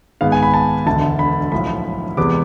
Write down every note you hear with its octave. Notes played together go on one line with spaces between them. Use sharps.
G#1 G#2 G#3 B3 F5
G#5
B5
A5
E1 D2 D3 A5
B5
B1 A2 F3 B5
E2 C3 G#3 B3 D6